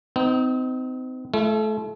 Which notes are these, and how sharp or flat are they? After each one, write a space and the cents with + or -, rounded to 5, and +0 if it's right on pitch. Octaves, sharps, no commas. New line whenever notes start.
C4 -35 D#4 +10
A3 -30 E4 +40